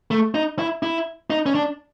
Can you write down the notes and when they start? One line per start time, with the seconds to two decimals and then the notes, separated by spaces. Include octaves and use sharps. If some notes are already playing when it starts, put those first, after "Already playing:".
0.11 A3
0.35 D#4
0.59 E4
0.83 E4
1.30 D#4
1.46 C#4
1.55 D4